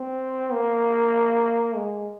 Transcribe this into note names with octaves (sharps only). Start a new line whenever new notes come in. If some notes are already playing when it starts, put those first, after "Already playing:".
Already playing: C4
A#3
G#3